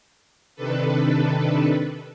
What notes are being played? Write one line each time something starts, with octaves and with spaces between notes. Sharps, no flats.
C3 D#3 D4 A4 B4